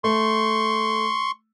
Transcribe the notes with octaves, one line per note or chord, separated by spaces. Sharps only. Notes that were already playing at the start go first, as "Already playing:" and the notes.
A3 C6 C#6